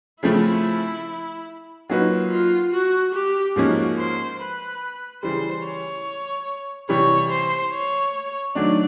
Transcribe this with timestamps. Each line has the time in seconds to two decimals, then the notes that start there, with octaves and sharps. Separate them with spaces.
0.23 C#3 F3 A3 C4 E4
1.89 F#3 A#3 D#4 F4 F#4 B4
2.31 F4
2.72 F#4
3.14 G4
3.56 G#2 F3 A#3 C#4 F#4
3.98 C5
4.39 B4
5.23 C#3 E3 G3 C5
5.64 C#5
6.89 C3 E3 G3 C#5
7.30 C5
7.73 C#5
8.55 D#3 F#3 A3 D4 D5